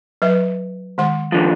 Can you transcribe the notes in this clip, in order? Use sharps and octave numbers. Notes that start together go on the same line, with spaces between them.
F#3 B4 E5
D#3 G#3 C6
D#2 D3 F3